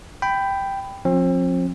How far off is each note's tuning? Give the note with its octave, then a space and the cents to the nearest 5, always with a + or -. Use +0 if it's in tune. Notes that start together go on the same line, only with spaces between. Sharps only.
G5 +0 B5 +15
F3 +30 C4 +35